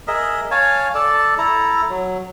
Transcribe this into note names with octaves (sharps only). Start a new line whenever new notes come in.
G#4 A#4 D#5 E5
C#5 F5 G#5 A5
A4 D5 A5
E4 A4 A#5
F#3